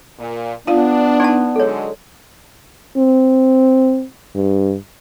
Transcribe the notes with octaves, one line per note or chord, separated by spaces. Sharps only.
A#2
B3 D4 F4 F5
D#4 D5 A5
D3 F#3 G#3 A4 C#5
C4
G2